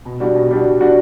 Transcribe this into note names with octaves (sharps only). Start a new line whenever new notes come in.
B2
G3 D4 F#4
B2
G3 D4 F#4
B2
G3 D4 F#4